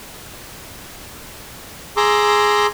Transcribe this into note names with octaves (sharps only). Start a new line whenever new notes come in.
G#4 A#5 C6 D6 E6